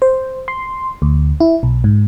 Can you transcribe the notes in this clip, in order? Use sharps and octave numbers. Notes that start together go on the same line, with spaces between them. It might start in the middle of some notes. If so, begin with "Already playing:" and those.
C5
C6
D2
E4
B1
G#2